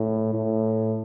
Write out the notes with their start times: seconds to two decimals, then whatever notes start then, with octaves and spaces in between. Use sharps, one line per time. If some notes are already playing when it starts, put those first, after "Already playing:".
Already playing: A2
0.34 A2